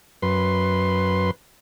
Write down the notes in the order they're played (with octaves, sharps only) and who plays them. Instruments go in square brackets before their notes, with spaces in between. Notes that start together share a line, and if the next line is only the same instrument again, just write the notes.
[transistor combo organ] F#2 B4 C6